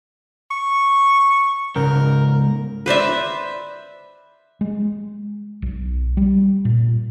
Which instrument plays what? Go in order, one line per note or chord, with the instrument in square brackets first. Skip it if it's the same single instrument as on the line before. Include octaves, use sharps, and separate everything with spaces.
[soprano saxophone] C#6
[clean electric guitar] C#2 G#2 [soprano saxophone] A#4
[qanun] B4 C5 D5 E5
[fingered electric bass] G#3
B1
G3
A#2